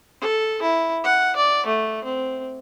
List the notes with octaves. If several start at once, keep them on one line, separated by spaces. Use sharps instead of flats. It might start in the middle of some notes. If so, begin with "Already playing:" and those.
A4
E4
F#5
D5
A3
C4